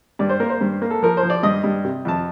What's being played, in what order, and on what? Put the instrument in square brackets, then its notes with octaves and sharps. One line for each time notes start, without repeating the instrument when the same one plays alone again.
[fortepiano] G2 D5
C5
A#3 A#4
C5
G2
A#3
A4
F3 A#4
C5
F3
D5
G2 D#5
G2
C3
F2 A5